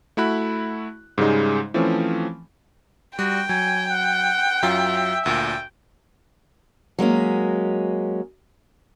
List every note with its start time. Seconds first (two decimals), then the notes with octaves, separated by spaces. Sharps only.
0.17 A3 E4 F#4 B5 F#6
1.18 G#2 C#3 G3 G#3 D#4
1.74 E3 F3 A3 C4 C#4
3.19 G3 F#4 G5
3.49 F#3 G#5
3.90 F#5
4.63 F#2 F#3 F4 E5
5.26 D2 A#2 G5
6.98 F#3 G#3 A#3 C#4